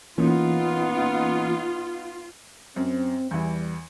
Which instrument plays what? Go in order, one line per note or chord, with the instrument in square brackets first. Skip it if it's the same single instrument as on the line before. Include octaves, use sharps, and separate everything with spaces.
[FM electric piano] E3 A#3 C#4 [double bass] B3 D#4 [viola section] F4
[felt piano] F#2 [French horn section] C4
[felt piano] E2 E3 [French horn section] G3